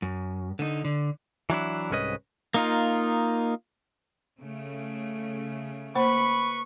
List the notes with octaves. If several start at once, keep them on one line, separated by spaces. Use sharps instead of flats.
F#2
D3 D#4
D3
E3 F#3 D4 E4
C2 G#2 C#4 B4 D#5
A#3 D#4 F4
C#3 A3
A#3 B4 C5 B5 C#6